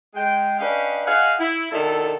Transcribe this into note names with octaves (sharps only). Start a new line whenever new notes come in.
G#3 G5
C#4 D4 B4 D#5 F5 G5
G#4 D#5 F5 F#5
E4
B2 D3 D#3 E4 A4